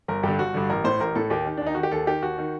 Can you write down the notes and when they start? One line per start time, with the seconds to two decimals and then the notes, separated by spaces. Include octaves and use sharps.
0.08 G1 A#4
0.23 G2 D3 G4
0.39 G1 F#4
0.54 G2 D3
0.70 A1 A#4
0.84 A2 C5
1.00 A1 A#4
1.15 A2 A4
1.30 D#2 G4
1.45 D#3
1.57 D4
1.61 D#2
1.66 D#4
1.75 D#3 F#4
1.83 G4
1.91 D#2 A4
2.07 D#3 G4
2.23 D#2 F#4
2.38 D#3